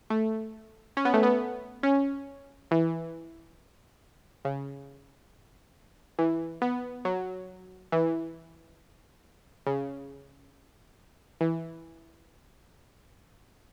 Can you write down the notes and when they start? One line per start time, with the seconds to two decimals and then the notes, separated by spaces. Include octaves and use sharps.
0.10 A3
0.97 C#4
1.05 B3
1.14 A3
1.23 B3
1.83 C#4
2.71 E3
4.45 C#3
6.19 E3
6.62 B3
7.05 F#3
7.92 E3
9.66 C#3
11.41 E3